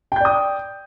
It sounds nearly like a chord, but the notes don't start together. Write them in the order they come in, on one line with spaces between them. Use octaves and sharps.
G5 G6 D5 D#6